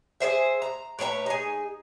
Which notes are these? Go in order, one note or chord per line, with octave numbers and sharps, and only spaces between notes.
G#4 A#4 C5 E5
A#5
A2 B4 C#5 A#5
D#4 G#4